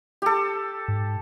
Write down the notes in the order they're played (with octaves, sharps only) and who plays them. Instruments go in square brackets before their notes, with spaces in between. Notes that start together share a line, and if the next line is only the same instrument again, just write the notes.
[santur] G4 A4
[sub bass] G#2